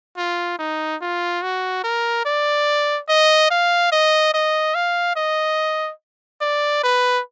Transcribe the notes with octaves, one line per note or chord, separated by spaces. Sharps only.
F4
D#4
F4
F#4
A#4
D5
D#5
F5
D#5
D#5
F5
D#5
D5
B4